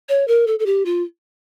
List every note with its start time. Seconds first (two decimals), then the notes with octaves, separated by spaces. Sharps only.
0.09 C#5
0.28 A#4
0.47 A4
0.59 A4
0.66 G4
0.86 F4